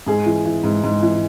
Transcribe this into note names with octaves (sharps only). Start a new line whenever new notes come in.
G#2 G#4
E3
E3
G#2
G#2
E3